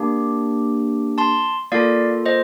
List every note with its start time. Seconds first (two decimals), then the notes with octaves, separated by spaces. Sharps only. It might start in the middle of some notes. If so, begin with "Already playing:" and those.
Already playing: A#3 D4 G4
1.18 A5 C6
1.72 A#3 F4 A4 D5 F5
2.26 C5 D#5